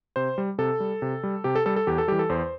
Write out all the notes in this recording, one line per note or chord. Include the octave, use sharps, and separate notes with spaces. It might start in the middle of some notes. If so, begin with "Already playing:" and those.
C3 C5
G3
C3 A4
G3
C3
G3
C3 G4
A4
G3 A4
A4
E2 G4
A4
E3 G3 G4
A4
E2 C5